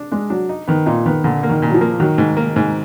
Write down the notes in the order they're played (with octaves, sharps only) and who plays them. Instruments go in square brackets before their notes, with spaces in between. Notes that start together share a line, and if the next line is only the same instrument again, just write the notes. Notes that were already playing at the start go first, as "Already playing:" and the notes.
Already playing: [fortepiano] D4
[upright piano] G#3 [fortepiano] D4
[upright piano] F#3 [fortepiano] D4
[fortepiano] D#4
[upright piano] D#3 [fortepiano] B3
[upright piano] A#2 [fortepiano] D#4
[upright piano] D#3 [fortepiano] B3
[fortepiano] A#2 [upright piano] D3
[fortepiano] A#3
[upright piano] D#3
[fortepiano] A#2
[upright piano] F#3
F3
[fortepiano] A#3
[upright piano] D#3 [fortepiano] F#3
[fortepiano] G#2
A#3
G#2